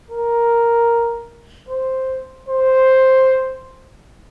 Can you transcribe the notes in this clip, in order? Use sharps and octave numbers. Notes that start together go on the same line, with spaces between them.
A#4
C5
C5